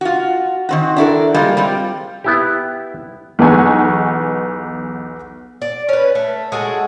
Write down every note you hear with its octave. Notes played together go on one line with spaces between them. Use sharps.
F4 F#4
D#3 C4 F#4
D4 E4 A4 A#4
G3 G#3 A#3 F4
G3 C4 F4
B3 E4 G4
B1 E2 B3 D#4 G#5 C#6
D5
C#4 B4
A3
G#3 F#4 G#4 A4